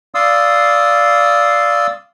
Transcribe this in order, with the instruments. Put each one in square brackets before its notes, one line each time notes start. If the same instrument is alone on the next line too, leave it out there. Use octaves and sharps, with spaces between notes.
[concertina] D5 F5 C6 D#6 E6